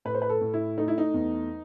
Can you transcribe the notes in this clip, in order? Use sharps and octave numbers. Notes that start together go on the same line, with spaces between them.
A2 B4
C5
B4
A4
A2
E4
A3 D#4
E4
D#4
E2